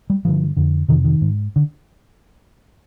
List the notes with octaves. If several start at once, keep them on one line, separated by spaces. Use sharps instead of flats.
G3
G2 D3 F3
F2 D3
F2 C3 D#3
D#3
G#2
D3